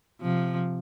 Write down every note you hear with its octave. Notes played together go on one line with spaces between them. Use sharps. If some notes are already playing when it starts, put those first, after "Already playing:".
C3 F3